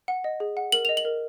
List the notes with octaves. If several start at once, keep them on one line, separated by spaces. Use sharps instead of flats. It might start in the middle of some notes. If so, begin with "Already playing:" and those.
F#5
D#5
G#4
F#5
A#4 F#7
D#5 F7
F#7
A#4